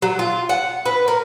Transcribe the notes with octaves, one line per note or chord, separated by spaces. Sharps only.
F#3
F4
F#5
B4
A#4